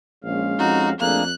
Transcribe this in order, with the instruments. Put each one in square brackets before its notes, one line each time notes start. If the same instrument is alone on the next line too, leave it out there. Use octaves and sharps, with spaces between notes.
[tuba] A#1 [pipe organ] G#3 C#4 F5
[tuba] F2 [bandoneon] D#4 [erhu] F#4
[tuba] F2 [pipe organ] A3 D4 G#4 [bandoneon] A#3 [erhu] F#6